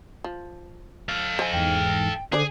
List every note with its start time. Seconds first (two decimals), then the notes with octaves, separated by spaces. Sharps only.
0.24 F3
1.09 A4 F5
1.39 C5 D#5 G#5
1.53 E2 G#2 G5
2.32 D3 D4 G#4 C5 D5 G#5